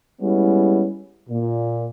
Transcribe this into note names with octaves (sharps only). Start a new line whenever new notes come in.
G3 G#3 B3 C#4 E4
A#2